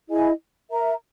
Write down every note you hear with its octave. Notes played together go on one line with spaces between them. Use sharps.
E4 G#4 D#5 G#5
A#4 E5 A#5